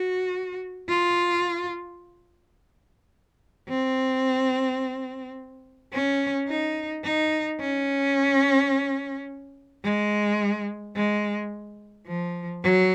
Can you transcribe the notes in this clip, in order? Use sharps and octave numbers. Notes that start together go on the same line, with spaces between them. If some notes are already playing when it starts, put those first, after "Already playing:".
Already playing: F#4
F4
C4
C#4
D#4
D#4
C#4
G#3
G#3
F3
F#3